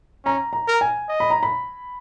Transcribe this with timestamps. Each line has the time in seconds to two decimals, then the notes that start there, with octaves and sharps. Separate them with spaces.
0.25 C#4 A#5
0.53 A#5
0.68 A#4
0.81 G#5
1.09 D#5
1.20 B5
1.30 A#5
1.43 B5